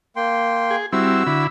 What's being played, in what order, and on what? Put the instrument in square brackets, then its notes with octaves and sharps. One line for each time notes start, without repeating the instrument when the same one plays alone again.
[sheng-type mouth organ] A#3 G5 C6
[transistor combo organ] G#4
[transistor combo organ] G3 C4 E4 [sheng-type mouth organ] F#4 E6
[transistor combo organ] D3 E4 B5